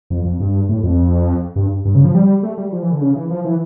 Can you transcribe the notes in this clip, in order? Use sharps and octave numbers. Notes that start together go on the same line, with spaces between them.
F2
F2
G2
A2
F2
G2
G2
C#3
F3
G3
A3
G3
F3
E3
D3
C#3
E3
F3
E3